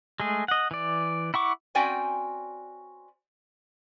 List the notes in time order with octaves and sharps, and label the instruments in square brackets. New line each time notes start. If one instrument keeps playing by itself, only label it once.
[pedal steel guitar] G#3 A3 G#4
D#5 F#5
E3 D5
E4 F#5 C#6 D6
[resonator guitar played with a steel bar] C4 C#4 F#4 D5 G5 G#5